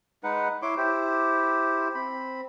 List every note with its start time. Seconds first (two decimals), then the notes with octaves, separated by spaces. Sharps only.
0.24 G#3 D#4 B4 F#5
0.62 E4 C#5 C6 D6
0.77 E4 G4 C5
1.95 C4 B5